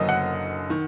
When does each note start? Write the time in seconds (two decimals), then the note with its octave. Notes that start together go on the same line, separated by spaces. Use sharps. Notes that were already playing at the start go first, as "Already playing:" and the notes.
Already playing: F#1 F#2 D3 F#3 A#3 D#5
0.09 F#5
0.70 D#3